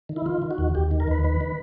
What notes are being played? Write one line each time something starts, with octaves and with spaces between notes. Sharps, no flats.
D#3
E4
D#3 F4
D#3
F#4
D#2
D#2 G4
D#3
A#4
D#2 B4
D#3 B4
D#3